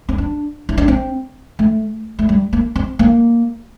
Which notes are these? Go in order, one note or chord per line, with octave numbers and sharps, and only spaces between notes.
C4
D4
E4
D4
C4
A3
A3
G3
A#3
C4
A#3